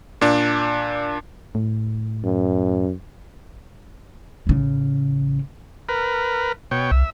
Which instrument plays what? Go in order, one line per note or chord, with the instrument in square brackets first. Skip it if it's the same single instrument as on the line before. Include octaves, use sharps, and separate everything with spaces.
[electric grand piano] A#2 D4
[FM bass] A2
[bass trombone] F#2
[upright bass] A1 C#3
[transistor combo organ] A#4 B4
B2 C#5 G5
[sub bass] C2 [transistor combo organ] E5